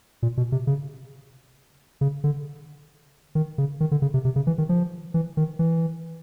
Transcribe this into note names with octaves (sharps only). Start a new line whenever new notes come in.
A#2
B2
C3
C#3
C#3
D3
D#3
C#3
D#3
D3
C#3
C3
C3
C#3
E3
D#3
F3
E3
D#3
E3